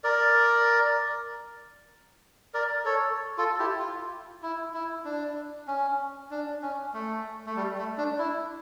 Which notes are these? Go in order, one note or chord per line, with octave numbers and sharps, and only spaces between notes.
A#4 D5
A#4 D5
A4 C#5
F4 A4
E4 G4
F4
E4
E4
D4
C#4
D4
C#4
A3
A3
G3
A3
D4
E4